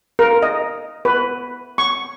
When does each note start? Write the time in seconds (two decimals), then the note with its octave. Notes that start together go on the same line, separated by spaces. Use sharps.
0.19 A#4
0.43 D#5
1.05 B4
1.78 C#6